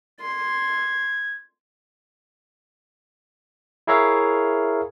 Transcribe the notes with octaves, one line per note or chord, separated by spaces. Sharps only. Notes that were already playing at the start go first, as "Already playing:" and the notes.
C6 G#6
E4 G#4 A#4 C#5 E5 F5